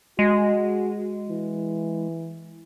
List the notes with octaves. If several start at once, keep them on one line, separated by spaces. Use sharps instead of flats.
G#3 F#4
E3